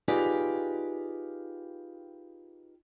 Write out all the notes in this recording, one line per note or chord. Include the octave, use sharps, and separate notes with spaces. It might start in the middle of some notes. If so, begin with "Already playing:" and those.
D#4 F4 G4 G#4 B4 D5